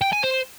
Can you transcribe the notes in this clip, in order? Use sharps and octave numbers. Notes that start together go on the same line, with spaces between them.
G5
G#5
C5